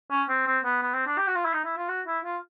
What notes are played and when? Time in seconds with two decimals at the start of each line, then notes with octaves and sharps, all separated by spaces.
0.11 C#4
0.29 C4
0.46 C4
0.65 B3
0.82 B3
0.94 C4
1.06 D4
1.18 G4
1.27 F#4
1.35 F4
1.45 E4
1.53 D#4
1.65 E4
1.77 F4
1.89 F#4
2.07 E4
2.25 F4